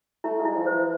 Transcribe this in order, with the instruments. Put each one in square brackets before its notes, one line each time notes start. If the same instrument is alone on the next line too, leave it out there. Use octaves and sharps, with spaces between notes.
[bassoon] A3 [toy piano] E4
[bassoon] G#3
[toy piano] E4
[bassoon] G#3
F3
[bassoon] F3 [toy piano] C5
[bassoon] E3